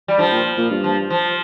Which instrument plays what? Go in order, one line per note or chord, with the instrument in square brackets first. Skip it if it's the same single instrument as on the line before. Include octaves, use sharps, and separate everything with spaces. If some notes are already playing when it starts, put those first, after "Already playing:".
[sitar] G3
[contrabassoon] G2 [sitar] F3
[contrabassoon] A#2
A#2
G2
[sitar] F3
F3